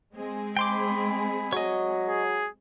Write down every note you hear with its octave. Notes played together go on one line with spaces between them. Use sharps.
G#3 C4 G#4
G5 B5 C6 D6
F#3 C#5 D#5
G#4